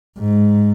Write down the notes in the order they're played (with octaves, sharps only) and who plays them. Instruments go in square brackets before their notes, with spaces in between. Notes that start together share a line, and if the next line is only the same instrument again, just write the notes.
[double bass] G#2